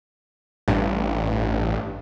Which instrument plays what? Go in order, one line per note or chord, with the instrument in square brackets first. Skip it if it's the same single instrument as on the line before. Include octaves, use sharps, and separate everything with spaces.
[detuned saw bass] A1 [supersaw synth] G2